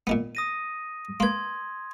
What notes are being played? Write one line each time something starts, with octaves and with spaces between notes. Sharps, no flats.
A#2 D#3 B3
D#6 A#6 D#7
A#3 B4 C6 G#6